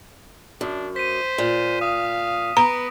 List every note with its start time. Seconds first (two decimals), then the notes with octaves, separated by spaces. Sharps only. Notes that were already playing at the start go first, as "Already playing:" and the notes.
0.61 F#2 D4
0.96 C5 B6 D#7
1.38 A#2
1.81 F5 D#6
2.57 B3 A#5 A#6 D7